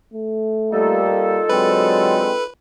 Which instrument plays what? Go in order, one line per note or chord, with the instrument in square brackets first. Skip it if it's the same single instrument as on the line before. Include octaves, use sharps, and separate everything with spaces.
[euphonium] A3
[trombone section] G3 A#3 [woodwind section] D#4 F4 A4
[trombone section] D3 G#3 C4 [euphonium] F#3 [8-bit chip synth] B4